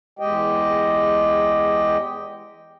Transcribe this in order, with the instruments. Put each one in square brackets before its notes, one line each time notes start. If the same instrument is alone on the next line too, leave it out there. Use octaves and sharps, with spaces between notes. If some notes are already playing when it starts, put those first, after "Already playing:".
[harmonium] E2 G#3 G4 D#5 G5